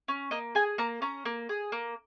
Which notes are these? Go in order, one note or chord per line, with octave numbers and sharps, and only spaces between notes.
C#4
A#3 D#5
G#4 G#5
A#3 A#5
C#4 A#5
A#3
G#4
A#3